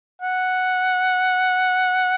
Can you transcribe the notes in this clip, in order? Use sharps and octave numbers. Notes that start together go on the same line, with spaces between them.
F#5